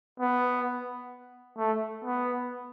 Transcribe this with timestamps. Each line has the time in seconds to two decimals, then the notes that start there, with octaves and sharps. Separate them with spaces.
0.20 B3
1.58 A3
2.04 B3